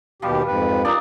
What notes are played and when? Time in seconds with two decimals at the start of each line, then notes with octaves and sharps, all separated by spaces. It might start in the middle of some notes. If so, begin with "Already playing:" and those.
0.22 D#2 B2 F3 G3 G4
0.47 F2 G#2 B4
0.85 D4 D#4 F4 A#4 D5